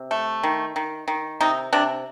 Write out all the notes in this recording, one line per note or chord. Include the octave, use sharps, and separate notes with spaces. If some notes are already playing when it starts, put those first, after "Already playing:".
Already playing: C3
A3
D#3
D#3
D#3
C3 D#4
C3 D4